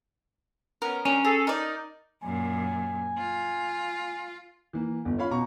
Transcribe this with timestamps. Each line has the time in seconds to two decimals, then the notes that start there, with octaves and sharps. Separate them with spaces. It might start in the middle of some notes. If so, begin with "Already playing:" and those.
0.82 B3 C#4 A#4
1.05 F#3 G3 C#4 D4 A#4
1.25 G#4 A4
1.47 D#4 A#4 D5
2.23 F#2 A#2 G#5
3.18 F4
4.73 E3 A#3
5.05 G1
5.18 C#4 F4 C#5 F5 B5
5.31 B2 A#5 C#6